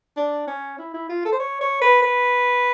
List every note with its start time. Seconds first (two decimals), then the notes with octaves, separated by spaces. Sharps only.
0.17 D4
0.47 C#4
0.78 E4
0.94 E4
1.09 F4
1.25 A4
1.32 C5
1.40 C#5
1.61 C#5
1.81 B4
2.02 B4